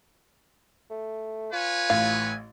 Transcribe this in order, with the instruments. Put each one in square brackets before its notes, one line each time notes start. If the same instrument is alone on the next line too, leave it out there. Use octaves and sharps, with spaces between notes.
[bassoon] A3
[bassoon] F4 [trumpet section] B4 C#5 G#5
[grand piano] A1 A2 [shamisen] F5